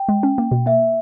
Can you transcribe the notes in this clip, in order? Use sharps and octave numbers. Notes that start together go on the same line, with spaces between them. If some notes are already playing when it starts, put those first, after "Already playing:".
Already playing: G5
G#3
C#4
A#3
B2
A#3 E5